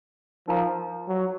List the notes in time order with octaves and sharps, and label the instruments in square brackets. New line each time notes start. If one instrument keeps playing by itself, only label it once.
[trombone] F3 [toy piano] D#4 A#4 F5 A#5
[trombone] F#3